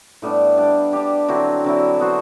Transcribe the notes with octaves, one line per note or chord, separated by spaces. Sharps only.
A2 G3 B3 D4
G3 D4 G4
G3 D4 G4
D3 F#3 C4 E4
D3 F#3 C4 E4
B3 F#4 C5